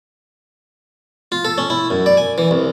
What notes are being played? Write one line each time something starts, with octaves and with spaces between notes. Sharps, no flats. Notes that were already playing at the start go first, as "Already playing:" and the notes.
F4
A4
C#4
E4
F#2
D5
G#5
E3
C2